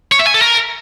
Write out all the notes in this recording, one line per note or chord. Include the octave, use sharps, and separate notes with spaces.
C#5
E5
G#5
A4
A#4